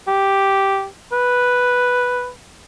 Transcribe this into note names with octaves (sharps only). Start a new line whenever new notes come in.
G4
B4